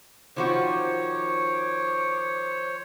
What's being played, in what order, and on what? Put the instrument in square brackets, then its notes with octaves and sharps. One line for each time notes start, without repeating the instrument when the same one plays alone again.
[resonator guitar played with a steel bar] D#3 F3 F#4 [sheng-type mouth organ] C5 [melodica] C#5 [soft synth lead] D6